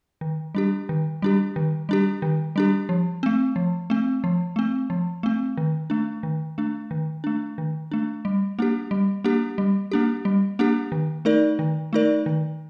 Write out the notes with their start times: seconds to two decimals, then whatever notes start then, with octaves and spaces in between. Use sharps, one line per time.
0.21 D#3
0.55 G3 D4 G4
0.89 D#3
1.22 G3 D4 G4
1.56 D#3
1.89 G3 D4 G4
2.22 D#3
2.56 G3 D4 G4
2.89 F3
3.23 A3 C4
3.56 F3
3.90 A3 C4
4.24 F3
4.56 A3 C4
4.90 F3
5.23 A3 C4
5.57 D#3
5.90 A3 D4
6.23 D#3
6.58 A3 D4
6.91 D#3
7.24 A3 D4
7.58 D#3
7.91 A3 D4
8.25 G3
8.59 A#3 D4 G4
8.91 G3
9.24 A#3 D4 G4
9.58 G3
9.91 A#3 D4 G4
10.25 G3
10.59 A#3 D4 G4
10.92 D#3
11.25 A3 D#4 A#4 D5
11.59 D#3
11.93 A3 D#4 A#4 D5
12.26 D#3